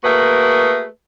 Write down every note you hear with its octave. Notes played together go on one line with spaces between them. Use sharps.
A3 A#3 F#4 G#4 A#4 B4